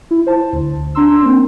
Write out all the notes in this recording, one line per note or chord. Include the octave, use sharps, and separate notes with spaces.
E4
C5 A5
D2
D4 A#5 C6 E6
A#3 C4 C#4